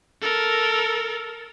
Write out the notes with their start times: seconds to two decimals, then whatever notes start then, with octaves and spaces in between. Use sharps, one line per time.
0.22 A4 A#4